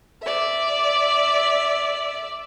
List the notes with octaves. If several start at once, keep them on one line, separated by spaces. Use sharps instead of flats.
D5 E5